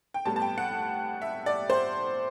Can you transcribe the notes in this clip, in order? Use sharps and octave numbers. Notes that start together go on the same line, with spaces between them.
G5
A2 G3 B3 A5
A5
G5
F#5
E5
D5
C5